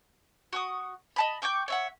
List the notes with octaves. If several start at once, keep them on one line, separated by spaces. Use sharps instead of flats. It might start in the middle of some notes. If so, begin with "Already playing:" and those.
F#4 C#6 D#6
D#5 A5 B5
G5 C#6 D6 G6
C#5 E5 F#5